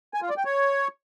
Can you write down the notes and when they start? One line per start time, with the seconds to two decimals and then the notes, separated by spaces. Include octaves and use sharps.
0.14 G#5
0.22 F4
0.30 D5
0.37 G5
0.45 C#5